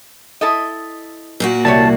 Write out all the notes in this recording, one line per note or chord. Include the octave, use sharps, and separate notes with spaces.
E4 A4 D#5
A#2 A#3 F#4
C2 G3 A3 C#5 A5